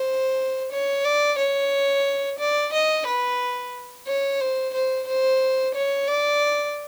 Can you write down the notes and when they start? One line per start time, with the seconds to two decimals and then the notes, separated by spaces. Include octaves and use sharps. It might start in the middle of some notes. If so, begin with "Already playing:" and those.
Already playing: C5
0.72 C#5
1.05 D5
1.38 C#5
2.39 D5
2.73 D#5
3.07 B4
4.07 C#5
4.40 C5
4.74 C5
5.07 C5
5.75 C#5
6.08 D5